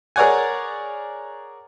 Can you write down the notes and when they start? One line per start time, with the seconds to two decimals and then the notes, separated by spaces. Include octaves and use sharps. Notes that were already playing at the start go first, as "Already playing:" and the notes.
0.16 G#4 A#4 C#5 D5 F#5 G#5